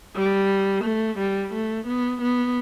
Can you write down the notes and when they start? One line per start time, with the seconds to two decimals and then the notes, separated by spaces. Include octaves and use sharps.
0.16 G3
0.84 A3
1.18 G3
1.53 A3
1.87 B3
2.21 B3